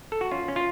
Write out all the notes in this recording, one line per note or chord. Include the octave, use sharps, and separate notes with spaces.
A4
F#4
C#4 F4
C#4
F4